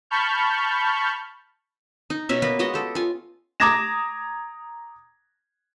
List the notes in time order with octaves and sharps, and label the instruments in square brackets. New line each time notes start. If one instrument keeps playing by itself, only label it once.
[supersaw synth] A5 B5 C#6 F6 G6
[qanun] D#4
B2 C#4 E5
A#3 B3 B4
G#3 B3 F#4 D#5
G4 A4
F4 G#5
[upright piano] A#5 D6 D#6 G#6 A#6 E7